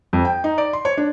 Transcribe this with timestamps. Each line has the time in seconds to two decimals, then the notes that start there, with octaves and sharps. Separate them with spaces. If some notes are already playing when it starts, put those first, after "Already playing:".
0.13 F2
0.25 G5
0.44 D#4
0.58 D5
0.73 C6
0.85 C#5
0.97 D4